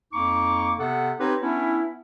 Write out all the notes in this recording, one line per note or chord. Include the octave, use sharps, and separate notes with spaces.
F2 A#3 D#4 C#6 D6
C3 B3 A4 F#5
C4 D#4 G4 B4 C#5
B3 C#4 D4 E4